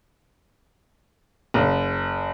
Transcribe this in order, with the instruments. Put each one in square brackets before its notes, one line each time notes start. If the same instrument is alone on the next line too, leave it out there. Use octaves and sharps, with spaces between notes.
[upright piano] F#1